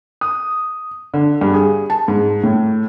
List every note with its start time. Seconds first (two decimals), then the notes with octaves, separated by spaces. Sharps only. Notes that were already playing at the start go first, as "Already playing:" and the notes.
0.21 D#6
1.14 D3
1.41 G2
1.54 G#4
1.90 A5
2.08 G#2
2.44 A2